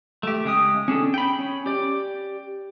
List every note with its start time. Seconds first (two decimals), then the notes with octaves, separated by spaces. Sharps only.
0.23 A3 G4
0.45 C#3 G#3 G5 D#6
0.88 C#4 D4 G#4 A4
1.14 G5 B5
1.39 C#4
1.66 G4 D5